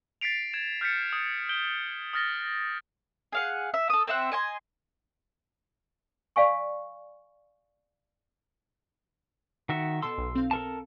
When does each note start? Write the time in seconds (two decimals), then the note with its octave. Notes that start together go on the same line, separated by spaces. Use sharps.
0.21 A6 B6 C7 D7 F7
0.53 G#6 E7
0.81 F6 G6 A6 B6 C#7
1.13 D#6
1.49 G6 D7 G7
2.13 D#6 F6 A6 A#6 G7
3.32 G#4 F5 F#5
3.74 E5
3.90 A4 D#6
4.07 C4 C5 E5 F#5
4.32 D#5 G#5 C6
6.36 D5 F5 G#5 C#6
9.69 D#3 F#4 E5
10.02 B2 A4 A5 C6 E6
10.18 B1
10.35 C4 F5
10.51 A4 A#4 A5